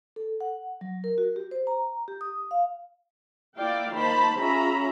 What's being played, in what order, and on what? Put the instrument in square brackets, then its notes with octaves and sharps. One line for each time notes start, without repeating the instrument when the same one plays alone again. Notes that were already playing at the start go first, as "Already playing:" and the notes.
[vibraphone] A4
F#5
F#3
A#4
F#4
G4
C5
A#5
G4
D#6
F5
[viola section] A#3 E4 D5 F5 G5
D#3 A#3 C5 A5 B5
C#4 F4 G#4 E5 A#5 B5